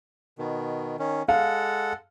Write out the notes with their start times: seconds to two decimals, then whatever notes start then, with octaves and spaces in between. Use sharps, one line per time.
0.38 B2 D#3
0.99 D#3 C#4
1.28 G#3 A4 F5 F#5